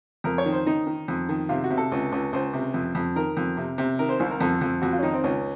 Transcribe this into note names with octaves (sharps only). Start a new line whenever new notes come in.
F2 A#4
C#5
D#3
C5
D#3 D#4
D#3
F2
D#3
C3 F4
F#4
C3
A4
C#2
C#2
C#2 C5
C3
F2
F2
D#3 A#4
F2
C3
C3
D#3 A#4
C5
C2 C5
A#4
F2 A4
F2
F2 F#4
F4
C#4
D#3 D#4
C4
C#2 C#4